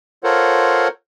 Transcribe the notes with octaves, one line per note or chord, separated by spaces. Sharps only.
F4 A4 A#4 C5 C#5 F#5